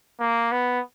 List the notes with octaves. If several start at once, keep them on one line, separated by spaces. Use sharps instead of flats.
A#3
B3